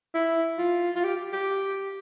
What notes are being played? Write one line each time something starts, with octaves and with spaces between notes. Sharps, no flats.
E4
F4
F4
G4
G4